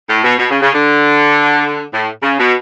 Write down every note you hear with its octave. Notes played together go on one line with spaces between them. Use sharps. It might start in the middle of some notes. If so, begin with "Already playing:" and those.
A2
B2
B2
C#3
C#3
D3
A2
C#3
B2